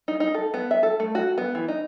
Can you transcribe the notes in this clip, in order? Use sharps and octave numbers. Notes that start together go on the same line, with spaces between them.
D#4
D#4
A4
B3
E5
A4
A3
F#4
B3
E3
D#4